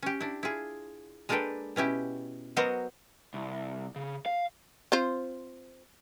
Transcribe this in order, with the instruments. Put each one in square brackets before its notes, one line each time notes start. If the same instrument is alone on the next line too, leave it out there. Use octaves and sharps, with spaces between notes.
[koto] C#4 G4
D4 E4
E4 F4 G#4
G#3 A#3 D4 A4 B4 G5
B2 C#4 E4 G4
F#3 B3 F#4 A#4 C5 D#5
[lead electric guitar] C2
C#3
F5
[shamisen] C4 F4 C5